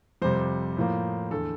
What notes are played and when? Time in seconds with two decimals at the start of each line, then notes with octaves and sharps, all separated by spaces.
0.22 F2 C3 G3 C5
0.77 A2 F3 A#3
1.31 E2 D3 A3 A4